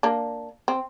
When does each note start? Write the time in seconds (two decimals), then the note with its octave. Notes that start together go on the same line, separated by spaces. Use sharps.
0.03 A#3 D4
0.68 C4